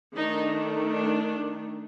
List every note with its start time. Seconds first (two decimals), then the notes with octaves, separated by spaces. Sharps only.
0.16 D#3 A3 D4 D#4
0.88 D4